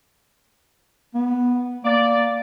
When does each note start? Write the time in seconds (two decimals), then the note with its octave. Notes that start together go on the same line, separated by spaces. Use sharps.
1.14 B3
1.84 A#3 D5